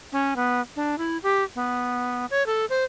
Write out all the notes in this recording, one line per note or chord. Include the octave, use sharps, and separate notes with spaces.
C#4
B3
D4
E4
G4
B3
C#5
A4
C5